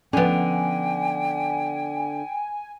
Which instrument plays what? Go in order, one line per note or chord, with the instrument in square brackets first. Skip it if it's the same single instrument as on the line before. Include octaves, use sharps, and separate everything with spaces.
[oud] D3 B3 [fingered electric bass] F3 C#4 [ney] G5 [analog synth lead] G#5